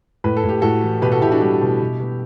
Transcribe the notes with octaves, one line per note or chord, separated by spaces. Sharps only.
A2 B4
A4
A2
G4
A2 F#4 A4
E3
B2 G4 B4
F#4 A4
B2 E4 G4
D4 F#4
G3 E4 G4
B2
B2
B2